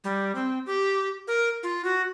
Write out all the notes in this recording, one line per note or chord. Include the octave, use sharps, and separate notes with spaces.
G3
C4
G4
A#4
F4
F#4